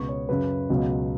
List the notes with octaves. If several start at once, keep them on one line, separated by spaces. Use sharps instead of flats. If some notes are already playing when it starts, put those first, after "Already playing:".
Already playing: C#2 B2 B3 C#6
C#5
F#2 C#3 F#3 B4
C#2 B2 F#3